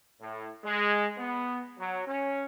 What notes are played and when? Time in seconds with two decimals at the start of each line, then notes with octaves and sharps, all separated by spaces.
0.20 A2
0.64 G#3
1.17 B3
1.78 F#3
2.06 C#4